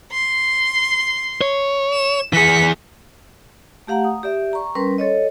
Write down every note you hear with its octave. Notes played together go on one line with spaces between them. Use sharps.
C6
C#5
E7
E3 G#4 B6 C#7
A3 G4 F5 F#5 A#5
D#6
G4 D5 E5
A#5 C#6
G3 C#4 A#4 B4 C6
A4 C#5 D#5